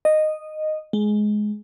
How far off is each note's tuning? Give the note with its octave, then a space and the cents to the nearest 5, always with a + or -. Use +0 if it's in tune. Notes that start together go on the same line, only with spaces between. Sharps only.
D#5 -10
G#3 +15